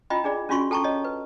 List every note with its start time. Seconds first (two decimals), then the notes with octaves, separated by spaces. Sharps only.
0.10 E4 F4 D#5 G5 B5
0.24 D4 G#4 D5
0.49 C#4 D4 F4 F#4 C6 C#6
0.71 A4 G5 A5 A#5 C#6
0.84 C#5 D#5
1.05 B4